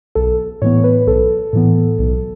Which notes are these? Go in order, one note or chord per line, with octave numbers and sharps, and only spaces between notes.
B1 A4
A2 E3 B3 C#5
B4
B1 A4
A2 E3 B3
B1